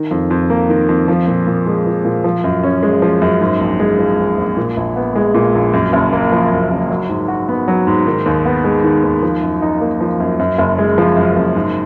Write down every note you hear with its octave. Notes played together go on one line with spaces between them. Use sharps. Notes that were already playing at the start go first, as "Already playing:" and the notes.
Already playing: D#3
F2
F2
A#3
D#3
F2
F3
A#2
A#2
G#3
F3
A#2
F3
F#2
C#4
G#3
F3
F#2
G#2
A#1
G#3
F3
G#2
A#1
A#2
A#1
B3
G#3
A#2
A#1
F#2
F#1
A#3
F3
F#2
F#1
F#3
G#2
F#4
B3
F#3
G#2
D#3
D#2
B3
G#3
D#3
D#2
F3
F#2
D#4
A#3
F3
F#2
F#2
F#1
G#3
F3
F#2
F#1
G#2